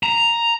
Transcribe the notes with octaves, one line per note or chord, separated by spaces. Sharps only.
A#5